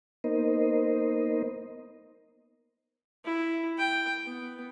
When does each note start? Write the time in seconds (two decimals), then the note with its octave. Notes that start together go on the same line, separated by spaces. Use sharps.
0.24 A#3 B3 D#4 A#4 C5 D#5
3.25 E4
3.78 G5
4.25 B3